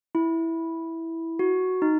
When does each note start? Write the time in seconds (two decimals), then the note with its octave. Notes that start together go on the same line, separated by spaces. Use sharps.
0.15 E4
1.39 F#4
1.82 D#4